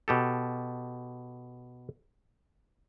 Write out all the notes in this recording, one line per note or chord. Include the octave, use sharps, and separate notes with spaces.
B2 G4 A4